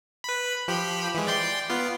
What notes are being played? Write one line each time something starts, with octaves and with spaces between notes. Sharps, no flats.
B4 B5
F3 G4 B5
E3 G#3
D5 G5 C6
B3 F4